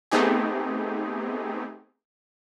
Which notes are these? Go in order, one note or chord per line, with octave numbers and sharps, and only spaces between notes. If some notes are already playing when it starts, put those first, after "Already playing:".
A3 B3 C4 D#4 G4 G#4